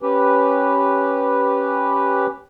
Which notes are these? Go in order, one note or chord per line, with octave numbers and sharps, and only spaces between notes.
C#4 G4 B4